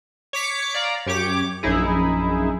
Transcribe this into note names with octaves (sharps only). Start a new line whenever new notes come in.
C#5 D6 B6 C#7
D5 F5 A#5
F#2 G4 C#5 D6
A#1 F#2 D#4 E4 G#4